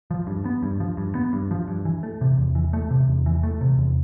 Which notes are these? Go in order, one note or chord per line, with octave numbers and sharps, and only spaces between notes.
F3
G2
B3
G2
F3
G2
B3
G2
F3
G2
E3
A3
C3
E2
E3
A3
C3
E2
E3
A3
C3
E2